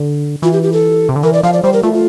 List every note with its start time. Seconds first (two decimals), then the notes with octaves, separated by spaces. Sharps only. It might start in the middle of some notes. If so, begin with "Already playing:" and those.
Already playing: D3
0.42 E3 F4
0.53 G4
0.63 G4
0.73 A4
1.09 C3
1.16 D3
1.23 E3 A#4
1.33 D5
1.43 F3 F5
1.53 D5
1.63 G3 C5
1.73 A#4
1.83 A3 F4
1.93 F4